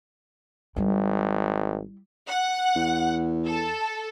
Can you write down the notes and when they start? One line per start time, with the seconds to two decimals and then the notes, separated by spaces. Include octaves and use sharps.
0.76 G#1 G3 E4
2.28 F#5
2.76 E2
3.46 A4